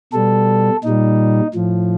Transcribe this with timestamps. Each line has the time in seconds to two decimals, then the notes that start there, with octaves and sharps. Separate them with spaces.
0.13 B2 G3 A4
0.84 A#2 G3 D#4
1.55 A2 F3